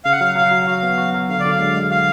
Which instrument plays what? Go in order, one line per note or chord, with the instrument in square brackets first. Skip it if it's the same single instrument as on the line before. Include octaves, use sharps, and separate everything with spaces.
[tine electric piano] C#3 [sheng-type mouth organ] F5
[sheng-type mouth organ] F#5
[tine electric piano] F#3 [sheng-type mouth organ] F5
[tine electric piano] F#3 [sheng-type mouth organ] F5
[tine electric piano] F#3
[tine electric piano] F#4 [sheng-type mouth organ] F5
[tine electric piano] B3
F#4
F#3
[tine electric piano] D3 [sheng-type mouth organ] F5
[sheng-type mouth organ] D5
[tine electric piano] D3
[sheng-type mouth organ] F5
[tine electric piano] G#3
G#3
[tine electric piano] F#4 [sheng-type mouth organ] F5